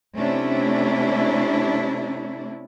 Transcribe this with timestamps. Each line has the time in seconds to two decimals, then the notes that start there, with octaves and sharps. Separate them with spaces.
0.17 C3 A3 C#4 D4 E4